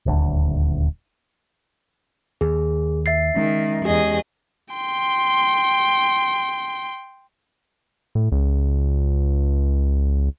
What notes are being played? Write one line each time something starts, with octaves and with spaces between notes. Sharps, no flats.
D#1 D2
D#2 G#4
E5 A6 C7
D#3 G#3 C#4
E2 G4 G#4 D#5
G5 C6
A2
C#2